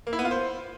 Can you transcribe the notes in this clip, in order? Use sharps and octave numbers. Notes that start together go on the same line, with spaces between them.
A#3
E4
B3
F4
C5